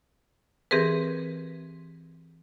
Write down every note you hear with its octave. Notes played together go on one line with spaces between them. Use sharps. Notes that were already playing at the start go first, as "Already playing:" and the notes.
E3 C4 G4 G#4 A#4 B4